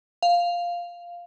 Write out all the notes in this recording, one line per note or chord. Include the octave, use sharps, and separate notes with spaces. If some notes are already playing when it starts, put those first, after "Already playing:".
F5